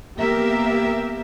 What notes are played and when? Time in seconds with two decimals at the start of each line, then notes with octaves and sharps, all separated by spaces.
0.18 A#3 B3 G4 A#4 E5